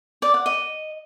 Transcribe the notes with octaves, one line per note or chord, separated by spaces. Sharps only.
D5
F#5
D#5